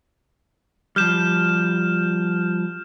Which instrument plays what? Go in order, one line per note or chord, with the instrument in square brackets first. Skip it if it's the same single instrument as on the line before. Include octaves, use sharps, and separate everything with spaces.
[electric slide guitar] F3 G3 [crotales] F6 G6 E7